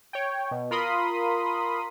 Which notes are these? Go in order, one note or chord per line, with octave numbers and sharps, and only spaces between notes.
C#5 G5
B2
F4 A#4 B5 C6 D#6